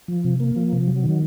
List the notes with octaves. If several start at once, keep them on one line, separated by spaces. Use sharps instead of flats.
F3
C3
A#3
F3
C3
F#3
D#3